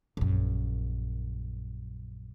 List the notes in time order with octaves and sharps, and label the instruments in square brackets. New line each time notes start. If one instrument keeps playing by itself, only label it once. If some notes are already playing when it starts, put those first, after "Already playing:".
[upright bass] A#1 F#2